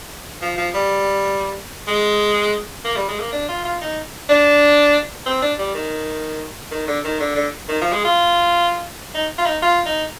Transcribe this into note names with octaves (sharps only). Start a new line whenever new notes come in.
F3
F3
G3
G#3
A#3
G3
G#3
A#3
D4
F4
F4
D#4
D4
C4
D4
G3
D#3
D#3
D3
D#3
D3
D3
D#3
F3
G#3
F4
D#4
F4
D#4
F4
D#4